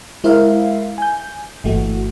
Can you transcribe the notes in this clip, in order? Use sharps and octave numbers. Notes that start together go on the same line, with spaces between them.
G#3 E4 A#4 C5 E5 F5
G#5 G6
G1 E3 A3 F#4